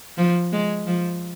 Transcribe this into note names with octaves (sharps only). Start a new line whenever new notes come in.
F3
G#3
F3